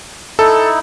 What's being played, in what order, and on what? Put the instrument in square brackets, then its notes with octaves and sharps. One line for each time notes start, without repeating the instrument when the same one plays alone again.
[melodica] D#4 E4 [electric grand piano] A4